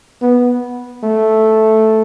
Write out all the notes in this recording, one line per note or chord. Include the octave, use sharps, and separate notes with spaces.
B3
A3